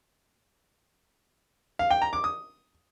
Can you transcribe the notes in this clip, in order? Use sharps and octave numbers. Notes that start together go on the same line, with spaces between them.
F5
G5
A#5
D6
D#6